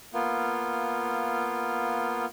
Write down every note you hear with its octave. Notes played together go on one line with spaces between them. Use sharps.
A#3 B3 F4